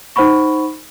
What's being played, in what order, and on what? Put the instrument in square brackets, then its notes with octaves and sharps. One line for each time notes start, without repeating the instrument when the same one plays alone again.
[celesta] D#4 C5 F#5 B5 C#6